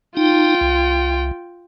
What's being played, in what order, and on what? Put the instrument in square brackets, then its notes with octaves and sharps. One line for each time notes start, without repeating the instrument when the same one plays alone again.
[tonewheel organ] D#4 [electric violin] F4 G5
[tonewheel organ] C2